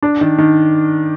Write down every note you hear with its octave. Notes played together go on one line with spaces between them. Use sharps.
D4
D#3
D#3